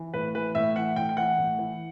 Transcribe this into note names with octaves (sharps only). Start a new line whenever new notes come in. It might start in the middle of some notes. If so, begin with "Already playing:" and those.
Already playing: E3
A2 B4
E3 B4
A2 E5
E3 F#5
A2 G5
G5
E3 F#5
A2
E3